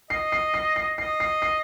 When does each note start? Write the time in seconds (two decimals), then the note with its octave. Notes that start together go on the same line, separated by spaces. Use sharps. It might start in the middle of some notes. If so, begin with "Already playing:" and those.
0.10 D#5 C7
0.32 C7
0.54 C7
0.76 C7
0.98 D#5 C7
1.20 C7
1.42 C7